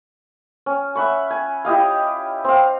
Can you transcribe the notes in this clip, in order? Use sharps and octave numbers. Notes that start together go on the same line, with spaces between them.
C#4
E5 F#5 B5 C#6
G#5
E4 G4 D#5 F5
C4 F5